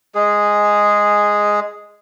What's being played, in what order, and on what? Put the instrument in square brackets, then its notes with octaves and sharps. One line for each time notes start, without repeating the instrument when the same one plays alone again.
[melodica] G#3 G#4